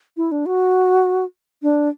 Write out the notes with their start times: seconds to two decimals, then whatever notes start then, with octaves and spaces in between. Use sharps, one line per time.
0.17 E4
0.32 D4
0.46 F#4
1.63 D4